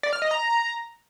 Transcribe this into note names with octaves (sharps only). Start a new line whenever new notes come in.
D5
F6
D#5
A#5